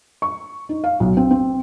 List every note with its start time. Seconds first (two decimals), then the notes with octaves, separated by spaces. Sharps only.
0.22 C#6
0.69 D#4
0.84 F5
1.00 B1
1.17 C4
1.31 C4